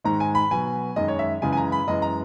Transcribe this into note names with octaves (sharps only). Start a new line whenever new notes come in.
G#2 D#3 G#3 A#5
G#5
B5
B2 F#3 G#5
F#2 D#3 G#3 D#5
C#5
E5
F#2 C#3 E3 G#3 G#5
G#5
A#5
B5
F#2 E3 G#3 D#5
A#5